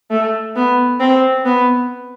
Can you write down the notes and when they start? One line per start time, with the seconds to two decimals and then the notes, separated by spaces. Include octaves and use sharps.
0.11 A3
0.56 B3
1.00 C4
1.45 B3